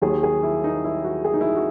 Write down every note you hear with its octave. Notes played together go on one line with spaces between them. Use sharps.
D#2 D#3 F#3 G#4
G#4
E4
D#4
E4
F#4
G#4
D#4
E4
F#4